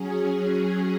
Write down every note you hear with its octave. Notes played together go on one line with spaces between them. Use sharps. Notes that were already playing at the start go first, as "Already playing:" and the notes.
Already playing: F#3 C#4 G#4